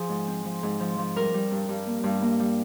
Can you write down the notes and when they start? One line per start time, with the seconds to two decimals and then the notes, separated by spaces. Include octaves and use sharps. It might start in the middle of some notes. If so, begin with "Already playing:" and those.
Already playing: F3 G#4
0.09 G#2
0.28 C4
0.45 F3
0.63 G#2
0.80 F3
0.98 F3
1.16 G3 A#4
1.34 G3
1.51 G2
1.69 G2
1.87 A#3
2.03 G2
2.22 A#3
2.40 G3